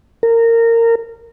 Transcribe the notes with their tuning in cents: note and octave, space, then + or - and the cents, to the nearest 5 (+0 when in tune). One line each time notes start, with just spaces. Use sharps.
A#4 -20